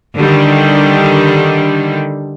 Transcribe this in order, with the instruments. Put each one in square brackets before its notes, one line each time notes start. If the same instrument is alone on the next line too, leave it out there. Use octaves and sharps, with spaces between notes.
[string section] D3 D#3 G3